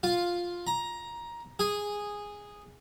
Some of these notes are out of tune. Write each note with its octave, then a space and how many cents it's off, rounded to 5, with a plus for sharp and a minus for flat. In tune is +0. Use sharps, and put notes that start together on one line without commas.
F4 +5
A#5 +15
G#4 -10